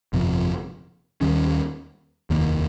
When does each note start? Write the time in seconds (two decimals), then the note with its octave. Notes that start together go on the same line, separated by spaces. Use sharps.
0.13 G1 F2 C3 F3
1.21 D#2 D#3 G3 C#4
2.30 F1 D#2 D#3 A#3